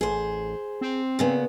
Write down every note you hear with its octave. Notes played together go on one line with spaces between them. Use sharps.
A1 G#4 C5
C4
A#2 C#3 B3